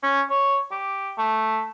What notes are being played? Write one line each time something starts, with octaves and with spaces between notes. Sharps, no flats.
C#4
C#5
G4
A3